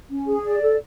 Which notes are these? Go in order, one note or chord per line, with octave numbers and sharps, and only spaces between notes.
C#4
G#4
D5
A4